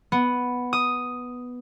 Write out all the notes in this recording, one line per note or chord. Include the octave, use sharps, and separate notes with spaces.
B3
D#6